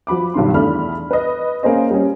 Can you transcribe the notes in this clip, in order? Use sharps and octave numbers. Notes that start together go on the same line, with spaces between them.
F3 F#4 B5 D6
B1 G2 D#3 C6
E2 A3 D4 B5 F6
B4 D#5
A#3 C#4 G#4 C5 D#5
G3 C#4